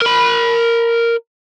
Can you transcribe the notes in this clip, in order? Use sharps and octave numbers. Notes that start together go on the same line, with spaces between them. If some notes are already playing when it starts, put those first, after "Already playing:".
A#4 B5